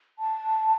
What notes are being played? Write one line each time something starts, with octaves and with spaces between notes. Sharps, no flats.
A5